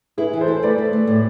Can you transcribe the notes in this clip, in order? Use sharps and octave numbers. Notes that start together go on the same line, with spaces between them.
E4 G#4 B4
E3
A4 C5
E4
C5
A3 B4 D5
A3
A3
A2